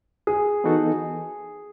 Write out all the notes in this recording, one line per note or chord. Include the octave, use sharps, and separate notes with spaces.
G#4
E3 B3 D#4 F#4 A4